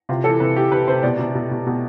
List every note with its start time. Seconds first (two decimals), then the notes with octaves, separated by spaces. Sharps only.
0.09 C3 F4
0.24 E3 A4
0.40 C3 B4
0.56 E3 G4
0.71 C3 B4
0.88 C3 C5
1.03 B2 D5
1.19 B2
1.35 B2
1.51 B2
1.66 B2